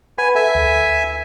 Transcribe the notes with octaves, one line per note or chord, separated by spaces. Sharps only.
B4 F#5 G#5 B5
A4 E5 G#5
D2